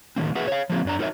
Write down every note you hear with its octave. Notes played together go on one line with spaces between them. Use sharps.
A2 D#3 A#3 C4
A#3 F#4 G#4 B4 E5 F#5
C#5 F5
F3 A#3 C4
F#2 D4 A#5
D#4 F#4 A#4 C#5 D5 E5